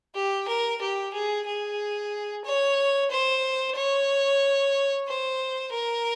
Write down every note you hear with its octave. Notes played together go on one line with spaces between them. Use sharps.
G4
A#4
G4
G#4
G#4
C#5
C5
C#5
C5
A#4